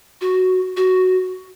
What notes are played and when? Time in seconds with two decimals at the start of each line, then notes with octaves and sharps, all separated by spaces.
0.21 F#4
0.76 F#4